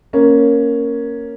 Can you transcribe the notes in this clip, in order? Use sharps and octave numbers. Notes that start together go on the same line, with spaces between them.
A#3 C#4